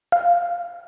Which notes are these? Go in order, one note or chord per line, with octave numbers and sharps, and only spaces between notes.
F5